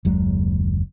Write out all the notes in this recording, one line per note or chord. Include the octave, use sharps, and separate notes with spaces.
F#1 D#2 F#3 G#3